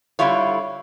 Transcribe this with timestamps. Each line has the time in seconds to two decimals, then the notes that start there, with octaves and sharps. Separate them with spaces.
0.19 D3 G3 E4 F4 C#5